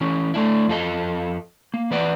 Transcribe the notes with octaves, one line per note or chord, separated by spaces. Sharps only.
E3 C#4
A3 D4 E4
F2 F4 A4 D#5
A#3
E3 B4 D5 F#5